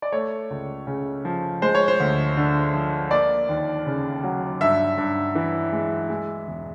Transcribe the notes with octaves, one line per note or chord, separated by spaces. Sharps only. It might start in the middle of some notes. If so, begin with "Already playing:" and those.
D5
A3 C#5
C#2
C#3
F3
G#3 C5
C#5
C5
D2
D3
F3
A#3 D5
D#2
C#3
F#3
G2 E5
G2
E3
G#3
G#3
E1